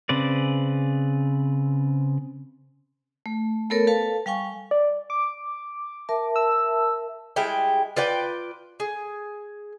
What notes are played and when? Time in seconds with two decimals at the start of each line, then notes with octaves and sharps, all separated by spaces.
0.09 C#3 C4 B4 D5
3.26 A3
3.70 A3 B3 A4 A#4 C#5
3.87 A4 B4 F5 A5
4.26 G3 F5 G5 G#5 C#6
4.71 D5
5.10 D6
6.09 A#4 E5 A5
6.36 E6
7.36 G3 G#3 E4 G5
7.97 F4 B4 D5 G5
8.80 G#4